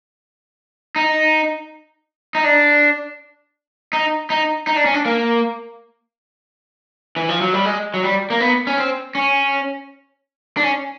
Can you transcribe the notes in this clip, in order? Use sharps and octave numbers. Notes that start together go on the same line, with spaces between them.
D#4
D#4
D4
D#4
D#4
D#4
D4
C#4
D4
A#3
E3
F3
F#3
G3
G#3
F#3
G3
A#3
B3
C#4
C4
C#4
D4
C#4